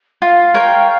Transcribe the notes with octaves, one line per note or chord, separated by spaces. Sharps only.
F4 F5
A#4 C#5 G5